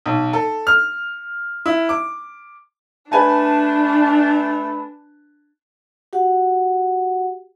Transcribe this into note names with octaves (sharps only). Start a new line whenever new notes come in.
B1
A4
F6
E4
D6
A3 D4 B4 G#5 A5
F#4 G4 F#5